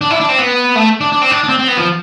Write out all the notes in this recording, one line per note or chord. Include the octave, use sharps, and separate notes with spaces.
D4
E4
D4
C4
B3
A3
D4
D4
C4
D4
D4
C4
C4
B3
F3